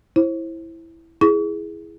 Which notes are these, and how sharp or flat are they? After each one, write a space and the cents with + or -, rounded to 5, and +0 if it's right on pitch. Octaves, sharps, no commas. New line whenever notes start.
E4 +0 C5 +30
E4 +0 G#4 +0 C#6 +40